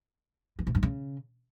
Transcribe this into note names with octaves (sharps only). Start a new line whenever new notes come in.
E3
C3
G2
C#3